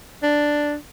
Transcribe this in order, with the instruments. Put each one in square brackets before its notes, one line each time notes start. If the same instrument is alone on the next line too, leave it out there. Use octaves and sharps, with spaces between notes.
[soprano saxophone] D4